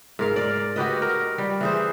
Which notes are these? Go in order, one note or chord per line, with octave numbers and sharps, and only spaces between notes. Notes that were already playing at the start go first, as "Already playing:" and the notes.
G#2 A#4 F5
D5
F#4 G4 B4 D#5
A#4
G3
E3 G#4 C5